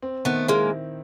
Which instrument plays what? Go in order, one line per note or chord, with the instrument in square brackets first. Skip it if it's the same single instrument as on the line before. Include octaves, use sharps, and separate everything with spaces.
[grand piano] C4
[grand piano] D#3 [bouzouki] A3 B3
[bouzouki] G#3 A#3 [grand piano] E4